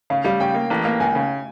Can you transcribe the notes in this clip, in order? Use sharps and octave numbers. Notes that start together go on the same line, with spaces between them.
C#3 F5
G3 F5
C#3 G5
A#3
A1
A#3
C#2 G#5
C#3